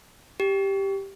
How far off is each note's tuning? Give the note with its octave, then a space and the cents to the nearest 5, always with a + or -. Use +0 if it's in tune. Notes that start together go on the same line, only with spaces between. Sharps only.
G4 +0